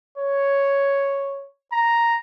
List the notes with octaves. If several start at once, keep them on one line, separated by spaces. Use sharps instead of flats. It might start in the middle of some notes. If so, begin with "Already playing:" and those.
C#5
A#5